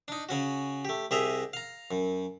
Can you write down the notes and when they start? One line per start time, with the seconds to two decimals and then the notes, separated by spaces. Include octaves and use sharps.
0.08 D4 D#4
0.29 C#3 C#4 F#4
0.85 A3 G4
1.11 C2 G4 G#4 D#5 E5 A#5
1.53 F5 A#5
1.91 F#2